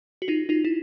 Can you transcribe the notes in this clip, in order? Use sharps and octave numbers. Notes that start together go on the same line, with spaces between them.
F#4
D#4 F4
D#4 F4
E4